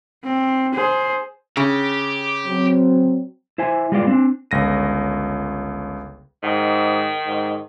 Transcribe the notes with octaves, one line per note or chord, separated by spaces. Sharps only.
C4
G#4 C5
C#3 G4
F#3 C4
E4 C5 E5 G#5
G3 G#3 B3 F4 D5
C4 D4
G1 C#2 A#6 D#7
G#2 D#3
G#2